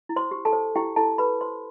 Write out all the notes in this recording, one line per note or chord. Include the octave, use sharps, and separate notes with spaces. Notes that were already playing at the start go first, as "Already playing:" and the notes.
E4
C5 C6
G4
A4 A5
C5
E4 G4 G5
E4 A4 A5
G4 B4 B5
C5 C6